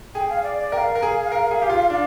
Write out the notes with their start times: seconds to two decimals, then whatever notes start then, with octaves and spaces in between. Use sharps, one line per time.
0.15 G#4 G5
0.30 F5
0.43 D5
0.58 D5
0.72 A#4 G5
0.77 F5
0.95 A#4
1.02 G#4
1.32 A#4
1.51 G#4
1.62 G4
1.70 F4
1.90 D4